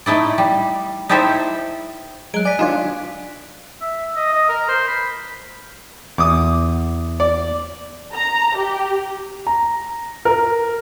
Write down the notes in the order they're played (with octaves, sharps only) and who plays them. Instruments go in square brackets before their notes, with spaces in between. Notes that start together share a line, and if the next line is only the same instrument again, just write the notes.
[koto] A3 D#4 E4 D5
G3
D#4 E4 G4 A4 C5 E5
[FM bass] F#3 [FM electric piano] G#3 [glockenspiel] F#6 D7
[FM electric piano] D5 [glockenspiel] G#5 B6
[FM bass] D4 [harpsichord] D#4 F4 C#5
[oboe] E5
D#5
D#5
A#4
C5
B5
[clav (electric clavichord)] E2 [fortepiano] D6 D#6
[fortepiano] D5
[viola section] A#5
G4
[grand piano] A#5
A#4